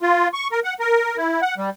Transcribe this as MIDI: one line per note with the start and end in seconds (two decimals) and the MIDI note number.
0.02 0.28 65
0.34 0.48 85
0.52 0.60 70
0.64 0.74 78
0.80 1.17 70
1.17 1.41 64
1.42 1.55 78
1.58 1.70 55